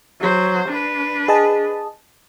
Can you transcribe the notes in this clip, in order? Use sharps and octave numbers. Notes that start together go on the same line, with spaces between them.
F#3 C5
D4 B4
G#4 D#5 A5